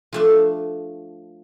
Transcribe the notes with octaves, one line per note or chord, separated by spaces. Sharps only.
F3 A3 D4